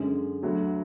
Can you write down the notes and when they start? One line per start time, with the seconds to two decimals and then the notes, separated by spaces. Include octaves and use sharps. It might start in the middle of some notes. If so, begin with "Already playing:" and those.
Already playing: F#2 D3 G#3 C#4
0.43 D2 D3 F#3